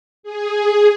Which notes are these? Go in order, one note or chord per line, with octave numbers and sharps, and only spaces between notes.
G#4